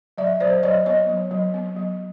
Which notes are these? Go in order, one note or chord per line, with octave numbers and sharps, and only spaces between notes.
F#3 D5 E5
F#3 C5 D5
F#3 C#5 D#5
B3 C#5 D#5
F#3
F#3
B3
F#3